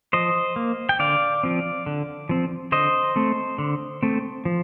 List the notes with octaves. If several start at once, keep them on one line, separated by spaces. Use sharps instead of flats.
F3 C5 D#5
A#3
G5
D3 D5 F5
F3 C4
D3
F3 C4
D3 C5 D#5
A3 C4
D3
A3 C4
F3